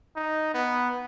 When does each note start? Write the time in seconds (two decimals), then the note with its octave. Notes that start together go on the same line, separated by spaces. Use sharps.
0.16 D#4
0.54 B3